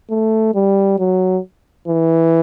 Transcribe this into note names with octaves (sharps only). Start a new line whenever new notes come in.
A3
G3
F#3
E3